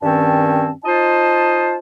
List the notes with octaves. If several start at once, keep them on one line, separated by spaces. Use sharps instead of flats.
G2 D#3 C4 C#4 A5
D#4 F4 C5 D#5 A5